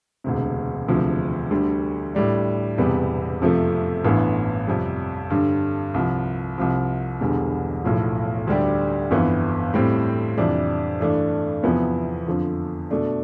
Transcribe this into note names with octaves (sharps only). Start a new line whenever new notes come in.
E1 D2 C3
E1 D2 C3 F3
D2 D3 G3
A2 G3 D4
E1 E2 C3 G3 B3
F2 C3 F3 A3
A1 G2 E3 B3
F2 C3 G3
G2 D3 G3
C2 C3 F3
C2 C3 F3
E1 E2 D3 G3
B1 A2 F3
D2 D3 G3 D4 G4
G1 F2 E3 B3
A2 G3 C4
F2 C3 E3 G3 D4
G2 E3 A3 D4
E2 C3 F3 B3 E4
F2 D3 F3
B2 A3 D4